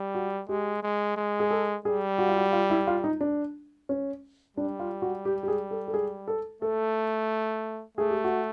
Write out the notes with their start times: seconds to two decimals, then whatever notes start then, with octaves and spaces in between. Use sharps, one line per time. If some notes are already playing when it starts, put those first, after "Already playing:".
Already playing: G3
0.15 F#4
0.49 G#3 G4
0.83 G#3
1.17 G#3
1.40 G#4
1.51 A4
1.85 G3 G#4
2.18 F#4
2.28 F4
2.37 F#4
2.53 F4
2.70 E4
2.87 F4
3.04 D#4
3.21 D4
3.89 C#4
4.57 G3 D4
4.79 F4
5.02 F#4
5.25 G4
5.43 G4
5.48 G#4
5.71 A4
5.88 A4
5.94 G#4
6.28 A4
6.62 A3 A4
7.97 A3 G#4
8.10 G4
8.24 F#4